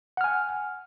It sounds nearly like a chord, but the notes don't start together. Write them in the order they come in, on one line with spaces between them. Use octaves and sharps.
F#5 F6 G#5